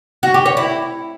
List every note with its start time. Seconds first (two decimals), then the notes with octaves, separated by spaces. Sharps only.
0.23 F#4
0.34 G4
0.46 C#5
0.57 E4